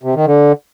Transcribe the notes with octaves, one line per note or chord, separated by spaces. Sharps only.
C3
D#3
D3